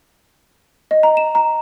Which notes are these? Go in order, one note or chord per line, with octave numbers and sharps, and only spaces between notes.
D#5
A#5
E7
A#5